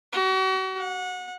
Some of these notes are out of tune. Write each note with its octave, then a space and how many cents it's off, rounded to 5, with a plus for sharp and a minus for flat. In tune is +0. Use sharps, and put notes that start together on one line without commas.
F#4 +40
F#5 -25